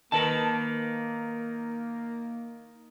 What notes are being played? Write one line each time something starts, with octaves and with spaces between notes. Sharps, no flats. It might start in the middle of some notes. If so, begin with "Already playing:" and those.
D#3 A#3 A#4 B4 A5